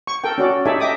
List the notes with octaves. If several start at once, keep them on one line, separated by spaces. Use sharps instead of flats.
C#6
A4 A#4 G5
C#4 F#4 D5
D#4 G4 A4 D5 E5 G#5
D#5 E5 G5 D6 D#6